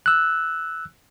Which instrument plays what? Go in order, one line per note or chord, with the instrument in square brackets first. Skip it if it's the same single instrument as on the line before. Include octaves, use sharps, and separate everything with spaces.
[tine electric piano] E6 F#6